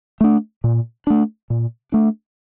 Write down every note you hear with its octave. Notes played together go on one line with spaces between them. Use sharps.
A3 D4
A#2
A3 D4
A#2
A3 D4